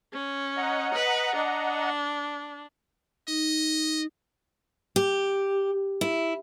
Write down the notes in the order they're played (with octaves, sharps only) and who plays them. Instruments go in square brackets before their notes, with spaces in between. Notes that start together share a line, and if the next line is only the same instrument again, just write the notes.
[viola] C#4
[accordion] D#5 F#5 A#5
[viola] B4
D4
[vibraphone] D#4 [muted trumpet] D#5
[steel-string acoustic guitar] G4
E4